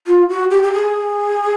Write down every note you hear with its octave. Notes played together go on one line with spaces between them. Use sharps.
F4
F#4
G4
G4
G#4